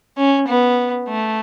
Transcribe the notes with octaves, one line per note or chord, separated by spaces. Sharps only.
C#4
B3
A3